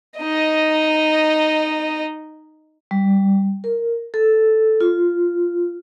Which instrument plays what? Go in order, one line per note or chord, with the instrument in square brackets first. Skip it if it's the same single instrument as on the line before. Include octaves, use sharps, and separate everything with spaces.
[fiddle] D#4 D#5
[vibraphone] G3
A#4
A4
F4